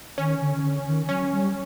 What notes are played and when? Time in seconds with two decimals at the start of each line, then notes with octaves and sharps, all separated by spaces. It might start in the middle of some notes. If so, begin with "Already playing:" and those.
0.18 D#3 C#4
0.40 D3
0.55 D#3
0.63 D3
0.86 D#3
1.08 F#3 C#4
1.32 G3